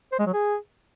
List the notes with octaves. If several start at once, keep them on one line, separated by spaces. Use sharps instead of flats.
C5
G#3
F#3
G#4